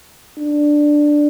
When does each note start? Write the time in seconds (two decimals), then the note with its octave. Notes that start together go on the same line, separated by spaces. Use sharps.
0.38 D4